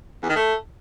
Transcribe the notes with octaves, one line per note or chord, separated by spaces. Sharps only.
E2
D#3
A3